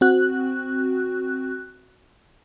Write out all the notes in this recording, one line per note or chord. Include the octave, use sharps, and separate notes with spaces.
C4 F#4 F#6